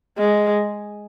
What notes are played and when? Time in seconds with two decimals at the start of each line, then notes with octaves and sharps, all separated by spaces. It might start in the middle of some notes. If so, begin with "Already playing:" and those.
0.18 G#3